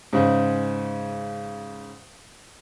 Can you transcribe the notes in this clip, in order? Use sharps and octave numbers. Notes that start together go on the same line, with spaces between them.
G#2 C#3